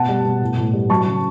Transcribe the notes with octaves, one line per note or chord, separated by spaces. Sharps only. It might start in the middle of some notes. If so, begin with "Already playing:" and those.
Already playing: B2 F#5 A5
G3
B2
A2
A2
G3
F#3 A5 C#6
C#3